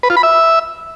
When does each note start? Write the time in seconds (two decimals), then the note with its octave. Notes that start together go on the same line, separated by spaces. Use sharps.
0.03 B4
0.10 F4
0.17 B5
0.23 E5